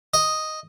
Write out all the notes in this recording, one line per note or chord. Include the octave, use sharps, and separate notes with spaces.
D#5